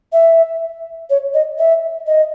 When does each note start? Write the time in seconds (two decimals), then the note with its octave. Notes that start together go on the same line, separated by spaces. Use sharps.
0.13 E5
1.10 C#5
1.34 D#5
1.59 E5
2.07 D#5